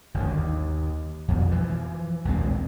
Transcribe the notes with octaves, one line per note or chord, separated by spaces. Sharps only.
G1 D2 D#3
D#2
F2 B2 D#3
E3 F3
A#1 D#2 G#3 C4